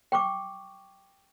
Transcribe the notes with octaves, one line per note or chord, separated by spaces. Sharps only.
G5 C#6 D6